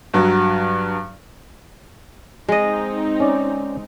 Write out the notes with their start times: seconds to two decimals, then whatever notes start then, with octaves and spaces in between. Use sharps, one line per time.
0.14 G2 F#3
2.49 G#3 C4 D#4 D#5
3.20 C#4 D5